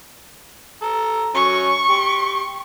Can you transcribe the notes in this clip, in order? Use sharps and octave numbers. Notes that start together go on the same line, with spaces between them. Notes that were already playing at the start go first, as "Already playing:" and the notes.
A4 A#5
F#3 C#4 C#6
G4 C6